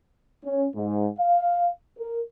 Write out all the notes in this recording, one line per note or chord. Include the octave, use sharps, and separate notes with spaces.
C#4
G#2
F5
A#4